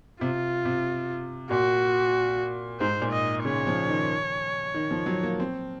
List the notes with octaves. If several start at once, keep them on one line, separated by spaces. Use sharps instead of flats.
C3 F4
C3
A#2 F#4
G#2 C5
A#2
D#5
C#3 C#5
F3
D#3
D#3
F3
F#3
A#3
C4